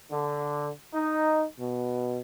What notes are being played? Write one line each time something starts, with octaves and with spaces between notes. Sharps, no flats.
D3
D#4
B2